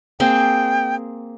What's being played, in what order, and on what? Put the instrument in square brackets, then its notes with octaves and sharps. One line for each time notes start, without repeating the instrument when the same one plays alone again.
[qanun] A#3 C4 G#4 [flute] G5